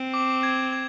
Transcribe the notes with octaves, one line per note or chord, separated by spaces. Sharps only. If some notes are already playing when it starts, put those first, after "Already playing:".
Already playing: C4
D6
G#6
G#6